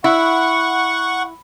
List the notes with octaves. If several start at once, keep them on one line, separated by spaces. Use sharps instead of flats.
E4 F#5 C#6